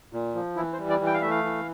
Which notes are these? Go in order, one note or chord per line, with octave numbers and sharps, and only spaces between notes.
A#2
F3
E3 E4
C5
G3
D5
E3
G5
F5
A3 E5
F5
E3